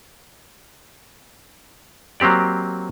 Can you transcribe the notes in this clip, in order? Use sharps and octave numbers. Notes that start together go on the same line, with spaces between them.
F#3 A#3 C4 G4 D5